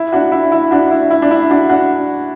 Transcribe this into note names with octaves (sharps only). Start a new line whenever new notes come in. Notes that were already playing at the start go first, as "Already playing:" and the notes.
Already playing: E4
D4 F#4
E4
E4
D4 F#4
E4
E4
D4
E4
D4 F#4
D4 F#4